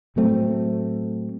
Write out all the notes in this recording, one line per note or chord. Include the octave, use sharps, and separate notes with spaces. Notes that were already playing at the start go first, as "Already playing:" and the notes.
A2 F#3 A3 C4